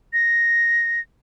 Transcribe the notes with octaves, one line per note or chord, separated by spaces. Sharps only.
A#6